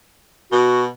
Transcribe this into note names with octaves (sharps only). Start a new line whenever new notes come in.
B2 F#4